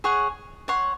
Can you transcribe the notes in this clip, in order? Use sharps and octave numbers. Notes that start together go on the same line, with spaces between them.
G#4 C#5 F#5
C#5 F#5 C6